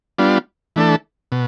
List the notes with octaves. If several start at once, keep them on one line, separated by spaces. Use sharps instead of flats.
G3 B3 D4 F4
E3 A3 D4 A4
B2